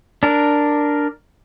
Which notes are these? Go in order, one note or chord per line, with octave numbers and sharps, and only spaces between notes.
D4 A#4